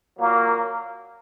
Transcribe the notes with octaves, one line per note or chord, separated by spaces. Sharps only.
A#2 F#3 A#3